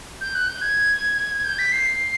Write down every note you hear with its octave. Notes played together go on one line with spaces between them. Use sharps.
G6
F#6
G6
G#6
G6
B6
C7